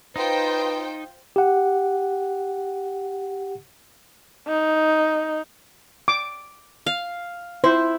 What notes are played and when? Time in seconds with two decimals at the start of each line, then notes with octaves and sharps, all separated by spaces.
0.16 D#4 F4 B4 C5 G5
1.36 G4 F#5
4.48 D#4
6.08 D6
6.86 F5
7.64 E4 C5